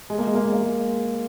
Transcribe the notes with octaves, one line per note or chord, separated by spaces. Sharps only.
G#3
A#3
G#3
A#3
G#3
A#3
G#3